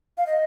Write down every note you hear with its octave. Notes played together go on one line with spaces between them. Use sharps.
F5
D#5